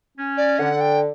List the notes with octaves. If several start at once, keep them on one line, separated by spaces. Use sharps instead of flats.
C#4
D5
D3 F#5
G5